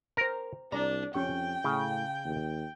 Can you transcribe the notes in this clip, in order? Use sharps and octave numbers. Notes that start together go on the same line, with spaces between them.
A#4 C5 A#5
C2 D4 D5 A#5
F2 C#4 G4 G5 C#6
A2 C#3 G#4
D#2